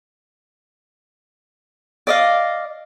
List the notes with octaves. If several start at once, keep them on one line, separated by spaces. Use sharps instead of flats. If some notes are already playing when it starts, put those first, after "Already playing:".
D5 D#5 F5